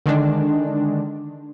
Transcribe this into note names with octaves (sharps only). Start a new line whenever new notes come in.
D3 D#3 G#3 D4